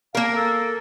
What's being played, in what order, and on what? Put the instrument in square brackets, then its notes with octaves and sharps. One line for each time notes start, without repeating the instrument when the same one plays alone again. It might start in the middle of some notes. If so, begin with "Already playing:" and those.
[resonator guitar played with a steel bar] A#3 A#4 [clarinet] F5
[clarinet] A4